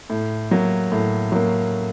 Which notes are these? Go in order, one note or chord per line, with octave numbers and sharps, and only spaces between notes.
A2
F#3 A#3
A2
F#3 A#3